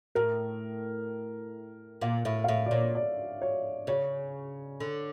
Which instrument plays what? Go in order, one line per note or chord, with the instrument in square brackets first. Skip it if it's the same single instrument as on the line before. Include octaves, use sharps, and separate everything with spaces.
[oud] A2 [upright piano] A#4
[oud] A#2 [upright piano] F5
[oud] A2 [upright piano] E5
[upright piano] F5
[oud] A2 [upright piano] E5
[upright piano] D5
[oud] A#2 [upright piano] C#5
[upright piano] D5
C#5
[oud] C#3 [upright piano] C#5
[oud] D3